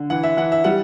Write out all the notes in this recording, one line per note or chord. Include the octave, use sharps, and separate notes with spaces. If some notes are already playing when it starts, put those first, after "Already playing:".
Already playing: D3
E3 F#5
E5
E3 F#5
E5
G3 F#5